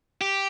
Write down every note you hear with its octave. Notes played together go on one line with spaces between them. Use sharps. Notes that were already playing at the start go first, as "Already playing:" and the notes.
G4